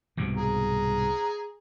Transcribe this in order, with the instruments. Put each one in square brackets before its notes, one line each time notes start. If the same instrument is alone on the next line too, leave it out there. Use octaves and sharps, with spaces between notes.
[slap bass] C2 G#2 B2
[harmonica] G#4 A#5